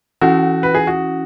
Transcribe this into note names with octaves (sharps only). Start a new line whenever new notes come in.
E3 C#4 E4 F#4
B4
G#4
F#4